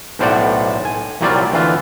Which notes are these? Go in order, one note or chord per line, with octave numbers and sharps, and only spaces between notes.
B1 A2 C5 D5 F#5
G#5
C2 A#2 F#3 G3 F4 D5
D2 E3 F4